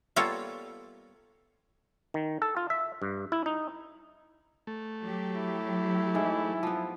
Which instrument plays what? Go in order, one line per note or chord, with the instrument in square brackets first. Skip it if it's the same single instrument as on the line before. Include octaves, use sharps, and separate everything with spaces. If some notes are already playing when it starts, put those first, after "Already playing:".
[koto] G3 A#3 B3 F4 A4 C#5
[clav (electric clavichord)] D#3
A4
F4
E5
G2
E4
D#4
[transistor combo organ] A3
[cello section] F#3 G4
[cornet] E4
[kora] G#2 E3
F3 B3